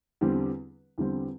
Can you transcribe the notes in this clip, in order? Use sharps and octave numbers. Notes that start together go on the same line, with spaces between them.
E2 D3 G3 C4
E2 D3 G3 C4